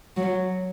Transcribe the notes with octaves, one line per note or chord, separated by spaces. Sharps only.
F#3